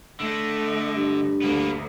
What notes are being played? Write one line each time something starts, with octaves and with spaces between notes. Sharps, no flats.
D3 A3 D#5
G2
D2 A#3 B3